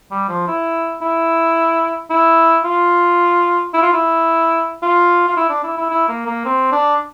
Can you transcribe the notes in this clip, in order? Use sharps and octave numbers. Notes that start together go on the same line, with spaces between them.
G3
F3
E4
E4
E4
F4
E4
F4
E4
F4
F4
E4
D4
E4
E4
E4
A#3
A#3
C4
D4